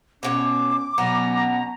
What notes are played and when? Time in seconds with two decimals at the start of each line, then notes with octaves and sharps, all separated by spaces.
0.23 B2 C#4 F#4 C#5 D6
0.98 B2 F#3 B3 C#4 A#5